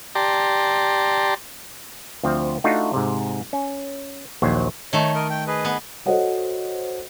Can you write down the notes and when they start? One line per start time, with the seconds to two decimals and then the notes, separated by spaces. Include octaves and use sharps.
0.15 G4 D5 A5 A#5 C6
2.23 D2 F3 C4
2.64 A3 D4 D#4 F4 F#4
2.93 G#2 C3
3.53 C#4
4.42 A#1 D#2 F#3 C5
4.93 D#3 A3 C#5
5.15 A#4 D#5
5.30 G5
5.47 G#4 B4 D#5
5.65 B3
6.06 F#4 A4 C5 C#5 D#5 F#5